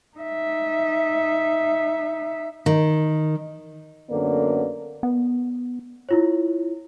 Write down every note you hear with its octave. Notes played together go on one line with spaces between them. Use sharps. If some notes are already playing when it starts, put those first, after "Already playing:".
D#4 E5
D#3
F#2 D3 A#3 B3 A4 D5
B3
E4 F4 C#5